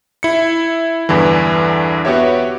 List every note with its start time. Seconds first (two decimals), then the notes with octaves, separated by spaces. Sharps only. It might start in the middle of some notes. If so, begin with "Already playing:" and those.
0.23 E4 C#7
1.09 E2 G2 D3 E3
2.05 B3 F#4 G4 C#5 E5